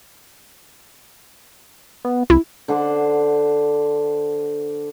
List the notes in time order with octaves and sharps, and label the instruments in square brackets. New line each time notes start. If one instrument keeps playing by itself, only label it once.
[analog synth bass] B3
[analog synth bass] C2 [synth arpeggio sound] E4
[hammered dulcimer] D3 C5 F#5 D6